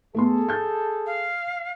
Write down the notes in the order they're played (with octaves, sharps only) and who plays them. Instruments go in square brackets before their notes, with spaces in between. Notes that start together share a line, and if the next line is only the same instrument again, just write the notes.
[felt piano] A3 B3 C6 [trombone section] G#4 A4
[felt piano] G6 A6
[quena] F5